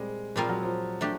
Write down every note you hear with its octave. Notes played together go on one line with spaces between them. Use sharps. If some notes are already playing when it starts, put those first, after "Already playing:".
Already playing: A#2 G3 G#3 C4
A#2 F3 G3 C4 F4 A#4
F#3
F3
A3 D4 G4